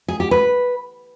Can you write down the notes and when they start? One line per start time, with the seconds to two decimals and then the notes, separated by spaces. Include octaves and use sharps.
0.08 G#4
0.20 G4
0.31 B4